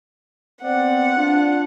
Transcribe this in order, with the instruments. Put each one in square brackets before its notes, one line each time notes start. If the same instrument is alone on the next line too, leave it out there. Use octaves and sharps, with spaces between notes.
[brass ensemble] B3 C4 D5 [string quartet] F#5
[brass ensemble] D4 F4